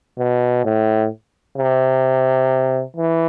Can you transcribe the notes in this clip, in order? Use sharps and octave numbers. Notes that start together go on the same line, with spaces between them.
B2
A2
C3
E3